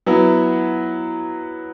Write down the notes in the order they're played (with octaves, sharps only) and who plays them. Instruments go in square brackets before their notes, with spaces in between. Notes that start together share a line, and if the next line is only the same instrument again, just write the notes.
[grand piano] F#3 B3 E4